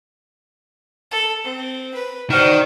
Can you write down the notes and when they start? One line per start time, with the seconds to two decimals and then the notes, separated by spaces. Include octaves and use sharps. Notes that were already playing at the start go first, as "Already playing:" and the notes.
1.11 A4
1.44 C4
1.94 B4
2.30 D#3 F#4 C5 D5 F6